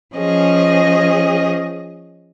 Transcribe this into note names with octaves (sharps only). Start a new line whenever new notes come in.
F3 C#4 G#4 D#5